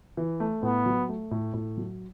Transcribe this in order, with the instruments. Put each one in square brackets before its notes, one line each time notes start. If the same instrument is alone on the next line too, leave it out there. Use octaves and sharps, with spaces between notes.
[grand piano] E3
A3
[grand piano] A2 [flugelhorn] B3
[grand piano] F#3
A3
A2
A2
F#3